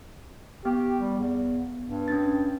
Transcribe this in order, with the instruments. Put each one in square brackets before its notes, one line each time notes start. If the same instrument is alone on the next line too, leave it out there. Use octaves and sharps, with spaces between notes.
[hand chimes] B3 [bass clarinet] G4
[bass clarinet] G3
E2
G2
[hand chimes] C#4 D4 A6